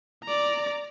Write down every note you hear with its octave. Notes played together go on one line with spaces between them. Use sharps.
D5 A#5